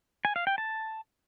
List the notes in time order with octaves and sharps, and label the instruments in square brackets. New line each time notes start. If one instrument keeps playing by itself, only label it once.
[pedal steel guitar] G#5
F5
G5
A5